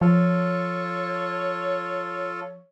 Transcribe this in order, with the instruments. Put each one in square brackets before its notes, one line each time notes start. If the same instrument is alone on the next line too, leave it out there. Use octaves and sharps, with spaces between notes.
[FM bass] F3 [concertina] F4 A4 [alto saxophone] C#5